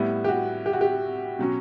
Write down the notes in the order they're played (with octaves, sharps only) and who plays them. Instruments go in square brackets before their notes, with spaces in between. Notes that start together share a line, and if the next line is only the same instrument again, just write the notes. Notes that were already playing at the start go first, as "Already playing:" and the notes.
Already playing: [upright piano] A2 G3 B3 E4
G4
F#4
G4
F#4
G4
B2 F#3 C#4